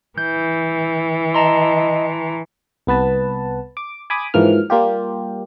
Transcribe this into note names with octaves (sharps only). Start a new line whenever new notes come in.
E3 G6
D#5 A5 A#5 C6
C2 B3 B4 A5
D6
G#5 B5 D6 D#6
G#2 E3 F3 A#3 F6
G3 A#3 F4 G4